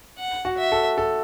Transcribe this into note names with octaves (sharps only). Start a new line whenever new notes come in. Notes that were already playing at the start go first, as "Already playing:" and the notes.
F#5
F#4
E5
A4
A4